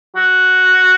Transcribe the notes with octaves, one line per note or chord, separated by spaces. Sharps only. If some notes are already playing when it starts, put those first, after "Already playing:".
F#4